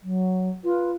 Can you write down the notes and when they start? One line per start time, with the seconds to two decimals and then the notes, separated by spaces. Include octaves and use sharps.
0.01 F#3
0.64 F4 B4